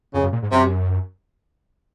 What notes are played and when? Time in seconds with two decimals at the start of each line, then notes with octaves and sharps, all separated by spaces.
0.14 F2 C#3
0.23 F#2
0.32 A#2
0.42 G#2
0.52 F#2 C3